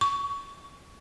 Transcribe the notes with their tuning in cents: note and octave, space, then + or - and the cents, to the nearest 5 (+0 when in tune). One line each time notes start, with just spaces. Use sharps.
C#6 +20